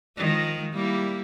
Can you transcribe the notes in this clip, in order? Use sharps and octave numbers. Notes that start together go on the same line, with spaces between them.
D#3 F3 G#3
G3 A#3 E4